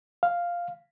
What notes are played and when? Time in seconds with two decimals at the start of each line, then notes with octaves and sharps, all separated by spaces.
0.23 F5